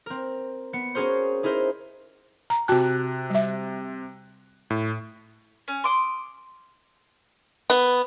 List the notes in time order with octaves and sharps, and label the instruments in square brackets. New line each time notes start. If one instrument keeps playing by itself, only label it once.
[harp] C4 A#4
B3 C#7
C#4 F#4 G#4 A#4 C5
D#4 E4 G#4 A#4 C5
[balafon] A#5
[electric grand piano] C3 F#6 [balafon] F#4 G5 A5
[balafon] G3 E5
[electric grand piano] A2
[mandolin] C#4
C6 D6 D#6
[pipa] B3